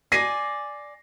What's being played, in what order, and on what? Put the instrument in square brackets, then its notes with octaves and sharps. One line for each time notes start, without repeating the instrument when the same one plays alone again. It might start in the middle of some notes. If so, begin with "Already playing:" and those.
[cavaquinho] D5 G#5 [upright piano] A#6 C7 D#7